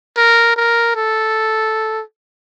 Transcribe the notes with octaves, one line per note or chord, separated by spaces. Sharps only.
A#4
A#4
A4